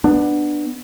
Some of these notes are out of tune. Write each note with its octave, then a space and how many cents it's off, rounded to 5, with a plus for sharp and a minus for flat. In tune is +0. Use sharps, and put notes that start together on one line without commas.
B3 +0 D4 +15